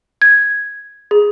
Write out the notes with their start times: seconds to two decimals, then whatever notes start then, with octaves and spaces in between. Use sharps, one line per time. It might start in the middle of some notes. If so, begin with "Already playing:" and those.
0.22 G#6
1.11 G#4